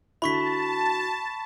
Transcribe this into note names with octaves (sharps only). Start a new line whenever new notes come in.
D3 E4 F#4 A5 B5 C#6 B6